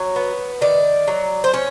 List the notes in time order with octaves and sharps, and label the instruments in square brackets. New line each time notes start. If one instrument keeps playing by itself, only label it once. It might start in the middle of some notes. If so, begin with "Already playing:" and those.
Already playing: [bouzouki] F#3 C#5
B3
D#3 D5
F#3
C5
C#4 C#5